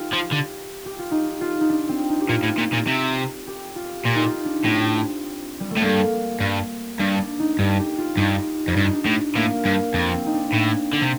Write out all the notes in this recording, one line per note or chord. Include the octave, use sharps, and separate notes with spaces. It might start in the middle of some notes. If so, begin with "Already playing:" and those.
Already playing: D#4 F4 G4
F3
D3
G4
F4
D#4
F4
D#4
D4
C4
D#4
G4
A#2 F4
A2
A#2
A#2
C3
G4
F4
A#2 G4
D#4
F4
D4
A2 C4
G3
A3
A2
G2 A#3
G2
G2 D4
D4
D#4
G2 G4
G4
F4
G2 D#4
F2
G2 D4
D#4
D4
A2
A2 A#3
G2
F2 C4
C4
D#4
D4
A2
D3
C3